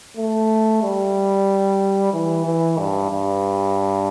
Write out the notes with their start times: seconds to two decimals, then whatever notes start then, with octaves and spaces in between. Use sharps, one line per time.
0.17 A3
0.83 G3
2.13 E3
2.46 E3
2.79 G2
3.11 G2